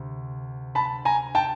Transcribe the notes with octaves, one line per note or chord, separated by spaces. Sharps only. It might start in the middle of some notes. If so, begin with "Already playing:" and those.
Already playing: D2 C3
A5 B5
G#5 A#5
G5 A5